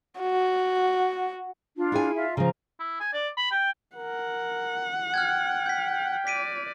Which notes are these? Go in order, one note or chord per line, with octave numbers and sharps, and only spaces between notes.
F#4
D4 F4
E4 G#4 G#5
F4 E5
C#3 F3 A#5
E4
G#5
D5
B5
G5
A#4 F#5
G5 F6 F#6 G#6
G6 B6
D5 B6 D7 D#7